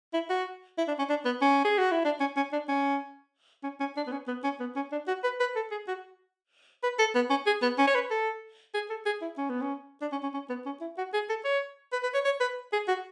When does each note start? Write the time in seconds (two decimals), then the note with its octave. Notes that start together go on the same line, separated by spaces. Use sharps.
0.14 E4
0.30 F#4
0.78 E4
0.88 D4
0.99 C#4
1.10 D4
1.25 B3
1.41 C#4
1.64 G#4
1.78 F#4
1.92 E4
2.05 D4
2.20 C#4
2.37 C#4
2.53 D4
2.68 C#4
3.64 C#4
3.80 C#4
3.97 D4
4.07 B3
4.12 C#4
4.28 B3
4.44 C#4
4.60 B3
4.76 C#4
4.92 D4
5.07 F#4
5.24 B4
5.40 B4
5.56 A4
5.71 G#4
5.88 F#4
6.83 B4
6.99 A4
7.15 B3
7.30 C#4
7.46 G#4
7.62 B3
7.78 C#4
7.87 C#5
7.95 B4
8.10 A4
8.74 G#4
8.90 A4
9.06 G#4
9.22 E4
9.38 C#4
9.49 B3
9.61 C#4
10.02 D4
10.12 C#4
10.23 C#4
10.34 C#4
10.49 B3
10.66 C#4
10.81 E4
10.98 F#4
11.13 G#4
11.29 A4
11.45 C#5
11.92 B4
12.03 B4
12.14 C#5
12.25 C#5
12.41 B4
12.73 G#4
12.88 F#4